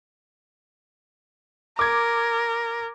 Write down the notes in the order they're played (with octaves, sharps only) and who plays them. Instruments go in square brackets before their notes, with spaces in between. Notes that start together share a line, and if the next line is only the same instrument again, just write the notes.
[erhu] A#4 [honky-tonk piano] D6 G#6